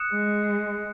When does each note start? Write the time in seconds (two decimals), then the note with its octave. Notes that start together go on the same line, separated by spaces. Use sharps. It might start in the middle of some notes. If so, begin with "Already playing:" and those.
Already playing: D#6 F#6 C#7 E7
0.14 G#3